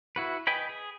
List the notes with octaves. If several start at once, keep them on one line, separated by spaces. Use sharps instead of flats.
E4 F#4 B4
B4 D#5 G5 G#5 B5
G#4